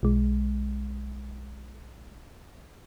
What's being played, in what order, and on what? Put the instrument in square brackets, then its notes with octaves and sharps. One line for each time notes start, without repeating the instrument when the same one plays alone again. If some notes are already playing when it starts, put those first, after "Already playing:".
[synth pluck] B1 G#3